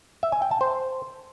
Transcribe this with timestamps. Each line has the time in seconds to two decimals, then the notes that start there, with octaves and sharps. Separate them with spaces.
0.23 E5
0.32 G#5
0.42 G5
0.51 A5
0.61 C5